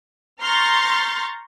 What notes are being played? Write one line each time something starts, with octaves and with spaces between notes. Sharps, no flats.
A#5 C6 C#6 F6 G6 A6